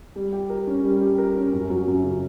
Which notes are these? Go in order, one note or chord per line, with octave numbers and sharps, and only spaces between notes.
G3
G4
A#4
C#4
G3
G4
A#4
C#4
F#2
F#3
F#2
C#3